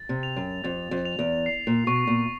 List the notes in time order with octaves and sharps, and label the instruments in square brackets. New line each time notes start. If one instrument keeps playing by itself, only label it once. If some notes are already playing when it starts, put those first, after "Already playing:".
Already playing: [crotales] A6
[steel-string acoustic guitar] C3
[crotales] F7
[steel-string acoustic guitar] F#2
[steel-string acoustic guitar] F2 [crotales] A6
[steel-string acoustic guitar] F2
[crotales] F7
[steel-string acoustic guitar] E2
[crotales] C7
[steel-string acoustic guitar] A#2
[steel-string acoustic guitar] B2 [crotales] C#6
[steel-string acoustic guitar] A#2